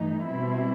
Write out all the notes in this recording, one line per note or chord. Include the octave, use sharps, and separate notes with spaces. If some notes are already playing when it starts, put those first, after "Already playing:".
Already playing: G2 E3 A3 D#4
B2 G3 C4 E4